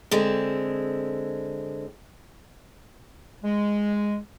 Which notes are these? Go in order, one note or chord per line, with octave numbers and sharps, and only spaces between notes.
D3 G#3 C4
G#3